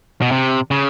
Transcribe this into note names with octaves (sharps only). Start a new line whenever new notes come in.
B2
C3
C#3